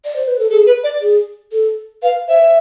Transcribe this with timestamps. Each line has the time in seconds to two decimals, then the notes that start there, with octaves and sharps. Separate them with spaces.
0.05 D5
0.16 C5
0.27 B4
0.39 A4
0.50 G#4 A4
0.66 B4
0.84 D5
1.01 G#4
1.52 A4
2.02 B4 F5
2.28 C5 E5